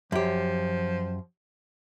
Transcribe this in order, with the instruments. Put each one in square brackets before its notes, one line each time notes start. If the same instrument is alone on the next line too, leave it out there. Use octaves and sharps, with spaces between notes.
[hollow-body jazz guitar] F#2 G4 [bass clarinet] F3